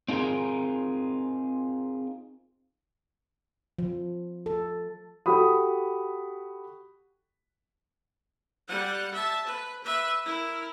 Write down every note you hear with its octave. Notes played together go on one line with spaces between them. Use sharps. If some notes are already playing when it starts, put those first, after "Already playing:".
C4 D#4 F4 G#4 A#4
F3
A4
F#4 G4 A4 B5 D#6
G3 F#5
E5 A5
B4
B4 E5
E4 A#4